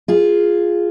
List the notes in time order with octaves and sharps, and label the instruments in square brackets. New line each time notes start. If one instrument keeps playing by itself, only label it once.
[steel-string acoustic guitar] F4 G#4